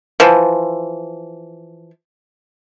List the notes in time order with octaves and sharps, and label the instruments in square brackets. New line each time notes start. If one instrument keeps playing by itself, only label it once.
[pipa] E3 F3